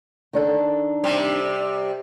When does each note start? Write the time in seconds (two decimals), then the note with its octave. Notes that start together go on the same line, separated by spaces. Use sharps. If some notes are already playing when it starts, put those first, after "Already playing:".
0.33 D#3 D4 A4
1.04 C3 G3